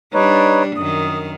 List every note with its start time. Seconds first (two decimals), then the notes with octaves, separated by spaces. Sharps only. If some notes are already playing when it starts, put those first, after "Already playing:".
0.14 G3 D4 D#4 B4 C#5
0.77 F#2 D#3 D#6